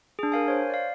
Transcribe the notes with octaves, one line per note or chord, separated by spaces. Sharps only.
D4 G#4
A#4 F5 G#5
C5 C#5
D5 F5